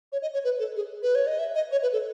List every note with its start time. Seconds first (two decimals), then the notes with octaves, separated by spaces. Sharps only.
0.12 C#5
0.22 D#5
0.34 C#5
0.44 B4
0.59 A4
0.76 G#4
1.03 B4
1.15 C#5
1.27 D#5
1.39 E5
1.55 D#5
1.72 C#5
1.83 B4
1.93 A4